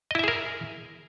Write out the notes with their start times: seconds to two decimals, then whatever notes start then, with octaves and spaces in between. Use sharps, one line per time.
0.11 D#5
0.15 E4
0.19 E5
0.24 G#4
0.28 A#4